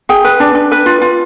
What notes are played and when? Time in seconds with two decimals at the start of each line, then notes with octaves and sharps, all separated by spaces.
0.09 G#4 G5
0.25 B4
0.40 D4
0.55 D4
0.72 B4
0.86 F4
1.02 F4